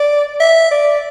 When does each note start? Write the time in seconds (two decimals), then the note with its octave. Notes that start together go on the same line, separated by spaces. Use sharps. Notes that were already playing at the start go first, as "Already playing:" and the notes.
Already playing: D5
0.40 E5
0.71 D5